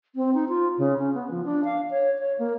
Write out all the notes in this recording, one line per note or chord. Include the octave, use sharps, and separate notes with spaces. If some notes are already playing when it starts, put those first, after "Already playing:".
C4
D#4
F4
C#3
C#4
B3
F3
D4
F5
C#5
C#5
A#3